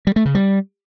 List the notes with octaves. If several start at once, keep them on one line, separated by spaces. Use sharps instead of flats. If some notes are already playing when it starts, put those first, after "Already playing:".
G3
A3
C#3
G3